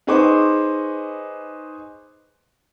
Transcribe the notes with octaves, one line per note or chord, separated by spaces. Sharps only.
D#4 G#4 B4 C5 C#6 D6